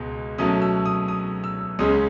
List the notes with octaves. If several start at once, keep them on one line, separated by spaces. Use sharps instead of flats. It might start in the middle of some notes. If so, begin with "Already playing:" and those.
Already playing: C#2 B2 G#3
B2 F#3 A3 C#4 D#6
E6
D#6
D#6
E6
C#2 C#3 G#3 C#4 D#6